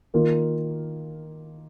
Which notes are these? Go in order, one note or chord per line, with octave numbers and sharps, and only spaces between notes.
D#3 A#3 F4 A#4